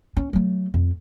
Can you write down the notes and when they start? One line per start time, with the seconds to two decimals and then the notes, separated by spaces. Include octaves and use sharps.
0.17 C#4
0.33 F#3 A3
0.74 F2